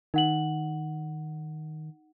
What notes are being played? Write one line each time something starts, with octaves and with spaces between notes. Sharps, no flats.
D#3 D#4 F#5 F#7